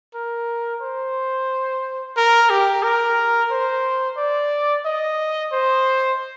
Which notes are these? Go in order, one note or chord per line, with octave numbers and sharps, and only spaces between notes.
A#4
C5
A#4
G4
A#4
C5
D5
D#5
C5